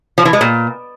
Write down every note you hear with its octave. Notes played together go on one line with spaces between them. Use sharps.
F3
E3
G#3
A#2